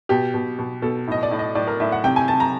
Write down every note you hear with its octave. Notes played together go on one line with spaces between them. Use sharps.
B2 G4
B2
B2
B2 A4
A2 D#5
D5
A2
D#5
A2 D5
A#4
A2 E5
F#5
C3 G5
G#5
C3 A5
A#5